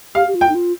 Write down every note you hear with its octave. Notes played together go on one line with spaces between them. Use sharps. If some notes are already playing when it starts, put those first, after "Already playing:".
G4 F5
G4
F4
G5
D#4
F4